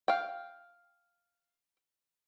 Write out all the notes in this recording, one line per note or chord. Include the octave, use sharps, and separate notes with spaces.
F5 G5